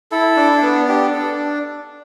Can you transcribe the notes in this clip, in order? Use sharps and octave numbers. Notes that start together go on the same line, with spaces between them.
E4 A4
D4
B3
D4 G4
D4 A4